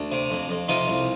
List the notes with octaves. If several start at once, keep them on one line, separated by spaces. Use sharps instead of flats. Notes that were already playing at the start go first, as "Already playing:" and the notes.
Already playing: D2 D4
C3
F2
F2
C3 D#4 F4
C2